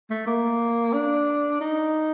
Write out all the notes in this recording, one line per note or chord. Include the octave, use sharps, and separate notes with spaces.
A3
A#3
D4
D#4